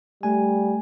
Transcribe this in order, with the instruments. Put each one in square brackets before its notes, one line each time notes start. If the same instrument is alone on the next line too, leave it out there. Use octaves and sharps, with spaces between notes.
[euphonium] G3 [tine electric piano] A3 G#5